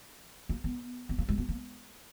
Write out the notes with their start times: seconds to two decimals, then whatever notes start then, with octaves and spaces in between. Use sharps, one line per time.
0.49 A#3
0.64 B3
1.09 B3
1.18 A#3
1.29 G#3
1.38 B3
1.49 A#3